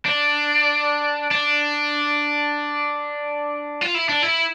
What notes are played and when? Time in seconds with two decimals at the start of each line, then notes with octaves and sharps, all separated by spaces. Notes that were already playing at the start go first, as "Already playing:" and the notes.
0.06 D4
1.31 D4
3.82 F4
3.95 E4
4.09 D4
4.23 E4